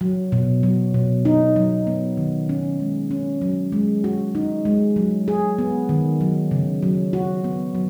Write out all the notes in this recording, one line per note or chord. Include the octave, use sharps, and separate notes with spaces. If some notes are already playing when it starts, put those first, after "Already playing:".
F#3
B2
F#3
B2
D#4
F#3
B3
D#3
C#4
G#3
C#4
F#3
G#3
F#4
D#4
G#3
F#3
G#4
B3
D#3
F#3
C#3
F#3
F#4
B3
F#3